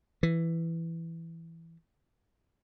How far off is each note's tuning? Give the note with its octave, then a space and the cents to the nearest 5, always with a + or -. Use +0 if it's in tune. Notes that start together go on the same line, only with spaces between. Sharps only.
E3 +5